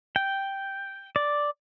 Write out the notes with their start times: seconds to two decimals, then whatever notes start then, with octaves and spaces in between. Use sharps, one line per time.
0.16 G5
1.16 D5